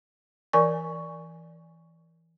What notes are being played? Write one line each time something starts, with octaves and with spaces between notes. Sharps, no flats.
E3 A#4 D5 G#5 C#6